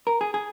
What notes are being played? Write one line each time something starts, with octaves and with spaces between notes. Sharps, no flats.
A#4
G#4
G#4